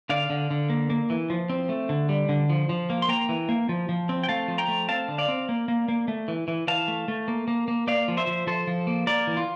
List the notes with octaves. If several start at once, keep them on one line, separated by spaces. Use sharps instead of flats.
D3 D5 F5
D3
D3
A#3
A#3
E3
F3
C4
A3
D3
G3
D3
F3
F3
A#3
C6
A#3 G5 A#5
E3
A#3
F3
F3
C4
G5
A3 F5 A5
F3
G5 A#5
A3
C4 F5 A5
D3
D5 F5
C4
A#3
A#3
A#3
A3
E3
E3
E3 F5 A5
A3
A3
A#3
A#3
A#3
A#3 D5 F5
F3
C5 E5
F3
F3 A4 C5
F3
A#3
A#3 A#4 D5
E3
F4